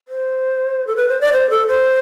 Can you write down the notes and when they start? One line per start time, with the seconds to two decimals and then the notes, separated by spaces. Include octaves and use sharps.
0.08 C5
0.87 A4
0.96 B4
1.08 C5
1.21 D5
1.33 C5
1.50 A4
1.67 C5